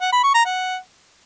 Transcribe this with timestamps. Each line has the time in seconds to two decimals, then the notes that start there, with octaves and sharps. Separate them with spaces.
0.01 F#5
0.12 B5
0.23 C#6
0.34 A#5
0.45 F#5